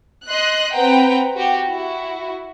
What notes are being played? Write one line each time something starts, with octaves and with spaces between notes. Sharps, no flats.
D#5 C6 F#6
C4 B4 F#5 G5 A#5
F#4 G4
E4 F#4